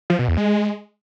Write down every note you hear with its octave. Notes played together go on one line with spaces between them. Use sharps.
F3
B2
E2
G#3